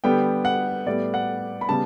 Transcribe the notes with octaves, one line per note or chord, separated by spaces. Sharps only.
D3 G3 B3 G5
F#5
A2 G3 B3 D5
F#5
B5
C#3 G3 B3 A5